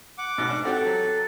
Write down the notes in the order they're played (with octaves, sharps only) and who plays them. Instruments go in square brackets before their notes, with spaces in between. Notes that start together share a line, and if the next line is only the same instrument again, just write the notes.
[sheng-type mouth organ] F#5 D6
[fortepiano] A1 G#2 B2
D4
[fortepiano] C4 F#4 G4 [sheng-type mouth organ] A4
[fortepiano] F#3